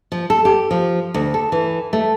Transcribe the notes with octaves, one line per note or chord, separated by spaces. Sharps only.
F3
A4
G4
F3
D2
A4
E3
A3